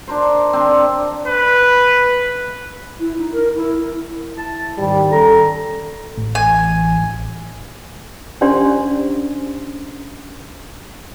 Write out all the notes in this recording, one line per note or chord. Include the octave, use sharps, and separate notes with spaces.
D4 A#4 C5
C4 D4
B4
E4
D#4
A#4
E4
E4 A5
G#2 D#3 G3
G3 C#4 A4 A#5
A1
G#5
C#4 D4 G4 C5 D5 C6